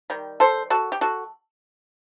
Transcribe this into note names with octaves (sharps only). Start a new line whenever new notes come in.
D#3 G3
A4 C5
F#4 A4
G4
F#4 A4